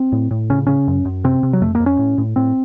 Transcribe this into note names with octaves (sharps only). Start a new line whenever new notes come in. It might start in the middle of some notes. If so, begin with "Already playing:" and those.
Already playing: C4
A2
A2
C#3 C#4
C#3 C#4
F#2
F#2
C3 C4
C3
F#3
F2 A3
A#3
F2
C#4
A2
A2
A2 C4